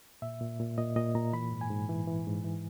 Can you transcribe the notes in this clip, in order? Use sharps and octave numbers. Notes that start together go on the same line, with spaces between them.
A#2 E5
A#2
A#2
A#2 D#5
A#2 D#5
A#2 A#5
E3 B5
G#2
G#5
G#2
E3
E3
G#2
E3